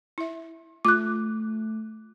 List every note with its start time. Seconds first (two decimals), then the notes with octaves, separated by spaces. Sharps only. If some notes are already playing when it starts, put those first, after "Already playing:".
0.18 E4 E5
0.85 A3 F4 D6 F#6